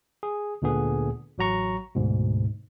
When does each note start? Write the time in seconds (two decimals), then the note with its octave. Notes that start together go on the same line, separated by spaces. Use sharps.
0.23 G#4
0.62 D2 A#2 D3 B3 G#4
1.38 A1 F#3 F#4 A#5 C#6
1.95 D2 G#2 B2